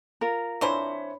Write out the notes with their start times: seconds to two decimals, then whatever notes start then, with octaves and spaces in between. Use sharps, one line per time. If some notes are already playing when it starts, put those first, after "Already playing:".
0.21 F4 A#4
0.61 E3 C4 D4 C5 C#5 B5